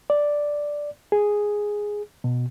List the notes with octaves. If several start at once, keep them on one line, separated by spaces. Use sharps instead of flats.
D5
G#4
B2